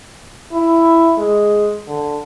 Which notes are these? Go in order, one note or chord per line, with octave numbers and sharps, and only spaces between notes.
E4
G#3
D3